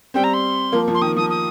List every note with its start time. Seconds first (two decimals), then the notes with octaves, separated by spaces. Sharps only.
0.14 G3 C4 G5
0.24 A#5
0.34 C6
0.72 F3 A#3
0.88 F3
0.95 C6
1.01 D#3 D#6
1.16 F3 D#6
1.30 D#6